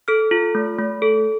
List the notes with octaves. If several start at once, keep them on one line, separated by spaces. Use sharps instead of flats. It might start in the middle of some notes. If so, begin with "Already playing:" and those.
A4 F6
F4
A3
A3
A4